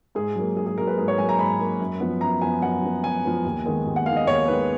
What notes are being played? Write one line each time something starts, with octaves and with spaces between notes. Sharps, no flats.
G#2 G#4
F#3 A#3
G#2 G#4
G#4
F#3 A#3 A#4
B4
G#2 G#4
C#5
F#3 A#3 G#5
A#5
G#2 B5
F#3 A#3
F#2
F3 B3
F#2 A#5
F3 B3 G#5
F#2 F#5
F3 B3
F#2 G#5
F3 B3
D#2
D#3 G#3 B3
D#2
F#5
D#3 G#3 B3 F5
D#5
D#2 C#5
D#3 G#3 B3 B4